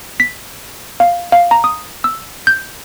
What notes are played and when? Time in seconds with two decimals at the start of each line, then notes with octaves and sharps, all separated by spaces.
0.20 B6
1.00 F5
1.32 F5
1.51 A#5
1.64 D#6
2.04 E6
2.47 G6